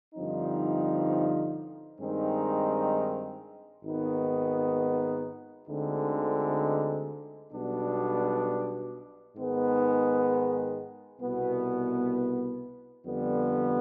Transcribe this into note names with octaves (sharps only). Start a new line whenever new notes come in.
G2 D3 F3 C4 D#4
G2 D#3 G#3 C4 D#4
G#1 G#2 D#3 B3 D#4
D2 D3 G#3 C4 D#4
B1 B2 G3 B3 D4
G#2 D#3 G#3 B3
C2 B2 B3
F2 D3 G3 B3